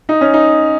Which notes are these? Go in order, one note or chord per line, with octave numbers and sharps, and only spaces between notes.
D#4
C#4
D#4